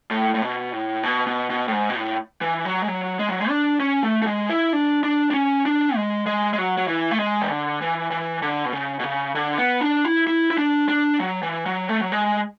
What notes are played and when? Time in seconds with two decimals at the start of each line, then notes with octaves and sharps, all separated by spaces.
0.11 A2
0.35 A2
0.42 B2
0.72 A2
1.03 B2
1.27 B2
1.50 B2
1.68 A2
1.72 G#2
1.89 B2
1.95 A2
2.41 E3
2.65 F#3
2.82 G#3
2.88 F#3
3.19 G#3
3.29 F#3
3.39 G#3
3.49 D4
3.80 C#4
4.03 A3
4.22 A3
4.27 G#3
4.50 E4
4.73 D4
5.03 D4
5.31 D4
5.34 C#4
5.66 D4
5.96 G#3
6.26 G#3
6.53 G#3
6.58 F#3
6.77 F#3
6.88 E3
7.11 A3
7.19 G#3
7.42 E3
7.50 D3
7.81 E3
8.11 E3
8.42 D3
8.66 B2
8.73 C#3
8.99 B2
9.03 C#3
9.35 D3
9.58 B3
9.81 D4
10.05 E4
10.27 E4
10.51 E4
10.58 D4
10.89 D4
11.20 F#3
11.42 E3
11.66 F#3
11.89 A3
12.01 F#3
12.12 G#3